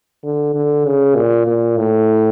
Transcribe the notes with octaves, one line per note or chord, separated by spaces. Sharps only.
D3
D3
C#3
A#2
A#2
A2